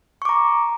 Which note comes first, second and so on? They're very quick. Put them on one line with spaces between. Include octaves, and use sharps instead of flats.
C#6 D6 A#5